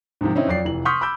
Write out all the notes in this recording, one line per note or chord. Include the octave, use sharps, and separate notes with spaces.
G#2 C3 D#3 F3
D#3 C4 C#4 D#4 E4
F2 F#3 D5 C7
F1 E3 F#7
C6 C#6 D#6 F6 G6 B6
B5 D6 E6 G6